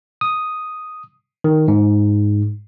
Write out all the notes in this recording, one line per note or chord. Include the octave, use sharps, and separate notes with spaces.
D#6
D#3
G#2